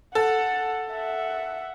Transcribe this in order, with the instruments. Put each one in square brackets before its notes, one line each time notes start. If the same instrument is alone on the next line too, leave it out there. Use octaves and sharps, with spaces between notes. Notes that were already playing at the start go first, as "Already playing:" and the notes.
[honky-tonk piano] A4 [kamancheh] F#5
[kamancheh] E5 F#5